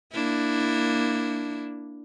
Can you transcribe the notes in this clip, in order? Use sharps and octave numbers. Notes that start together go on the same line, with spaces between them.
A#3 D4 E4